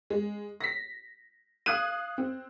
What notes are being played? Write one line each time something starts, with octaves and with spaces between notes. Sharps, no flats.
G#3
A#6 B6
F5 D#6 F#6 G#6 D#7
C4